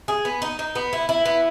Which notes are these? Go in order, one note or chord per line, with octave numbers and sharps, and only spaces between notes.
G#4
B3
D#4
D#4
B3
E4
E4
B3